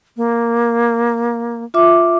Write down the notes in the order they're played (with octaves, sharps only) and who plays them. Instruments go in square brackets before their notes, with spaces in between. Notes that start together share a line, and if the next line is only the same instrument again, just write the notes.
[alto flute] A#3
[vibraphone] F4 E5 D6